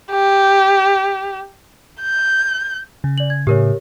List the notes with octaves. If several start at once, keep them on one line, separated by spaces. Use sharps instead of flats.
G4
G6
C#3
D5 F#7
G#6
A2 C#3 G4 A#4 C#5